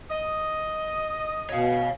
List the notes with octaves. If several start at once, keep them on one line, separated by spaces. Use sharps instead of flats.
D#5
B2 C#5 F5